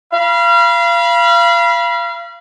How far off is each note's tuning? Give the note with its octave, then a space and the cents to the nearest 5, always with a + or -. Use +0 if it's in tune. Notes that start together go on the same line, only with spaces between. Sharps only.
F5 -30 B5 -30